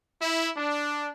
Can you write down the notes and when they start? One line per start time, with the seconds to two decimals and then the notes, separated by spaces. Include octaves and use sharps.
0.20 E4
0.57 D4